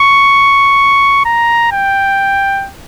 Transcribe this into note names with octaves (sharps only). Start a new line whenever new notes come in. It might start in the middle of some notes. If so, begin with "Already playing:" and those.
Already playing: C#6
A#5
G5